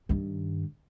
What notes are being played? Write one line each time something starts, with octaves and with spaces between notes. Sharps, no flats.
G2 D#3